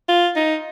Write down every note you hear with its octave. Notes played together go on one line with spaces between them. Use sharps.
F4
D#4